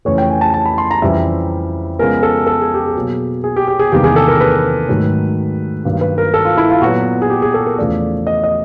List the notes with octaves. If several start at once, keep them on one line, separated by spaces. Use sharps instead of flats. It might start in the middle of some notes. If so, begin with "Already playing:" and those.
F2 C#3 E3 A3 C#5
G5
G#5
A5
A5
B5
C6
A#5
F2 C#3 E3 G3 E5
C#3 F3 G#3 B3 A#4
A4
A4
G#4
G4
G#4
B2 F#3 A#3
G#4
G4
G4
G#4
E2 C3 D#3 G3 A#3 G4
G#4
A4
A#4
B4
G#2 D#3 F#3 A3
G2 D#3 F#3 A#3
B4
A#4
A4
F4
E4
F4
A#2 F#3 B3 F#4
G#4
G4
G#4
A4
A#4
E2 C#3 F3 A3 D5
D#5
D#5